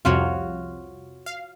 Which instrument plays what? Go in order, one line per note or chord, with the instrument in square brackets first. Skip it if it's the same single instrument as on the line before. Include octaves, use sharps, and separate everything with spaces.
[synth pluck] C2 F2 C3 [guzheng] F4 F#4 C#5
[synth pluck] F5